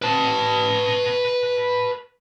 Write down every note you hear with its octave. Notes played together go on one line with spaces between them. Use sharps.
B4 A5